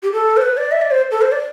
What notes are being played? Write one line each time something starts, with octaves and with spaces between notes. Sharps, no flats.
G4
A4
C5
B4
D5
E5
D5
C5
A4
C5
D5